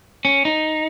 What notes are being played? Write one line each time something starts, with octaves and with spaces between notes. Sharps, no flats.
C#4
D#4